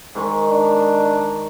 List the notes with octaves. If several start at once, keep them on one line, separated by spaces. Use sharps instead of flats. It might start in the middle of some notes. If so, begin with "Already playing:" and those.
G#2 D#3 C#6
D4